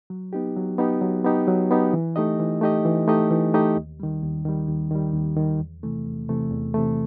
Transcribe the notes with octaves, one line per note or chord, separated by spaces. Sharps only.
F#3
B3 D#4 G4
F#3
B3 D#4 G4
F#3
B3 D#4 G4
F#3
B3 D#4 G4
E3
A3 D#4 G4 D#5
E3
A3 D#4 G4 D#5
E3
A3 D#4 G4 D#5
E3
A3 D#4 G4 D#5
D#2
D#3 G3
D#2
D#3 G3
D#2
D#3 G3
D#2
D#3 G3
E2
C3 E3 A3
E2
C3 E3 A3
E2
C3 E3 A3